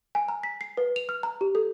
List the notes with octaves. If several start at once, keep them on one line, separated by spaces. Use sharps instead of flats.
G#5
A#5
B6
C7
B4
F7
F6
A#5
G4
A4